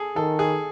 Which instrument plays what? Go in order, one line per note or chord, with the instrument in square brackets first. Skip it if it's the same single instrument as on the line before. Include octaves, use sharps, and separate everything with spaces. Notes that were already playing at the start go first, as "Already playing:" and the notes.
Already playing: [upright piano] G#4 A4
[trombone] D#3 [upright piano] A4
[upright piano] G#4